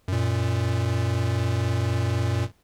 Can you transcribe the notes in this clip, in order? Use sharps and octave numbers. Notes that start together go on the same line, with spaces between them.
F#2 A#2